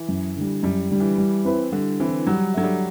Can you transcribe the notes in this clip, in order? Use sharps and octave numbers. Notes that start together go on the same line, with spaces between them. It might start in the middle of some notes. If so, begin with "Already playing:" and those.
Already playing: E3
F#2
D3 G3
F#2 G3
D3 G3
E3
G3
C4 E4 B4
D3 G3
E3 C4 E4 B4
F#3 G3
F#3 D4 A4 E5
G3